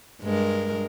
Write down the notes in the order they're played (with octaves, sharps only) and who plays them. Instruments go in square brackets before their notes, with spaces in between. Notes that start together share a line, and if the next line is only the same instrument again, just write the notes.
[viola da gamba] G2 G#3 A#4